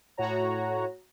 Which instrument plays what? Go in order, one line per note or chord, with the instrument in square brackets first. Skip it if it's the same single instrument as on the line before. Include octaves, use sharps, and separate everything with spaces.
[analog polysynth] A2 F#4 C#5 A#5